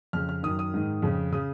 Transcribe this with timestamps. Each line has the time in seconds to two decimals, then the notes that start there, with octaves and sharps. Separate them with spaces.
0.13 F2 C#3 F6
0.29 F6
0.43 F#2 D#3 D#6
0.59 D#6
0.74 G#2 D#3
1.02 F2 C#3
1.32 C#3 D#6